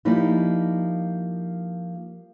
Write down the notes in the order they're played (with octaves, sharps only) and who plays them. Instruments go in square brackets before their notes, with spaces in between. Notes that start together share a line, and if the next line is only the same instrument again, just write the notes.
[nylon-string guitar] F3 G3 A#3 D#4 E4